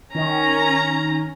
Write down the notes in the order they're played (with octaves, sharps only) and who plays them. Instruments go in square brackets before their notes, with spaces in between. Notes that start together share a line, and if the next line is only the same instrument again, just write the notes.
[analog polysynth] D#3 [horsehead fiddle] C#4 [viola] A#5